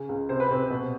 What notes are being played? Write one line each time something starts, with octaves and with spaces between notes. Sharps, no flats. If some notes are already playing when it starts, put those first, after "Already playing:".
Already playing: C#3
C#2
C3 C5
B4
C3 C4 C5
B2